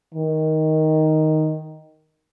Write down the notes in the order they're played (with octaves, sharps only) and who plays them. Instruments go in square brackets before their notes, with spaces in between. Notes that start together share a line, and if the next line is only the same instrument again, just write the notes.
[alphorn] D#3